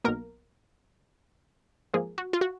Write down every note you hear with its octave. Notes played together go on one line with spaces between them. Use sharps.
B1 B2 A#3 A#4
G#2 F3 A#3 G#4
F#4
F4
F#4